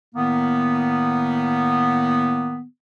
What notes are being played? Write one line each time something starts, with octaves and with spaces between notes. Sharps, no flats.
A2 D#3 A#3 B3